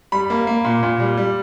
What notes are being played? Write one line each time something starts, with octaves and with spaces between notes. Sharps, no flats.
G3 B5
A#3
A#3
A#2
A#2
G3
G3